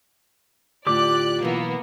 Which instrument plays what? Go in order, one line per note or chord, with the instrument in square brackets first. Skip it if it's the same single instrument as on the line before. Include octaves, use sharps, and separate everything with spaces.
[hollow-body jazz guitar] D2 A2 [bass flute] F4 [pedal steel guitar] G4 D6 [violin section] D5 F#6
[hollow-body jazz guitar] B1 E3 [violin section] A#3 B3